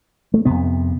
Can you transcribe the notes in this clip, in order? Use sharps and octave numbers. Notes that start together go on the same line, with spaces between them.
A3
F2 C3 B3